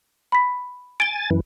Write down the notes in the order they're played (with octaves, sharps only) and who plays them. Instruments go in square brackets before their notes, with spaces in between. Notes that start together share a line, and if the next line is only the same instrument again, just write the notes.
[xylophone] B5 B6
[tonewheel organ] G#5 A6 [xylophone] D7 G7
[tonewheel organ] F#2 E3